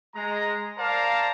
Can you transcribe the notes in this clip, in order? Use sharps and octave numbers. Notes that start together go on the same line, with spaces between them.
G#3 A#5
A#4 C5 D5 F5 A5 A#5